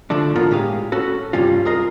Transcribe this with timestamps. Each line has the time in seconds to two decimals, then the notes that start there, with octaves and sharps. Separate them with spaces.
0.10 D3 F3 A3 D4
0.36 A2 D3 B3 F4 A#4
0.51 A2 G#3 G4 G#4 F5
0.92 C#4 F#4 A4
1.33 C#2 G2 C3 G3 C#4 F4
1.65 F4 G#4 A#4 D#5